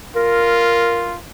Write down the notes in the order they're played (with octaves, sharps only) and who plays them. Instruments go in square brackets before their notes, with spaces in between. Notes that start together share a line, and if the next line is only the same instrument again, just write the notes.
[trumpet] F4 [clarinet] A#4